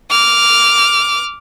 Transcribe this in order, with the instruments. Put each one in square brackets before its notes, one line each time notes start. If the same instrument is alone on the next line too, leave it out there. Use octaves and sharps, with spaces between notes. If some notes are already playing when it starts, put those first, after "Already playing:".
[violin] D6 F6